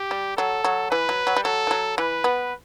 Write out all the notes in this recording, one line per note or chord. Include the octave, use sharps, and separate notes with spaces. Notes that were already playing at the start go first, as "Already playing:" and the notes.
Already playing: G4
G3
F#3 A4
F#3
E3 B4
F#3
F#3
G3
F#3 A4
E3
F#3
E3 B4
B3